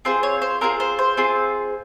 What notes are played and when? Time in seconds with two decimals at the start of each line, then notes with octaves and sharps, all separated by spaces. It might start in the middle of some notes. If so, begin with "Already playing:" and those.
0.05 C4 F4 G#4 C5
0.23 C#5
0.42 C5
0.61 C4 F4 G#4 A#4
0.80 C5
0.99 C5
1.17 C4 F4 G#4